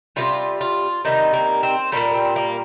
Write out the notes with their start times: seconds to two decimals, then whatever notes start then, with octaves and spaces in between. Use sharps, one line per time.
0.16 C3 D#3 G3 F4
0.61 F4
1.05 C3 D#3 G3 D#4
1.33 A#3
1.63 C4
1.92 A#2 G3 A#3
2.13 C4
2.36 A#3